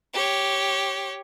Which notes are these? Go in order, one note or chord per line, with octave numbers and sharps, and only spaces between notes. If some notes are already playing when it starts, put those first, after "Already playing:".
G4 C#5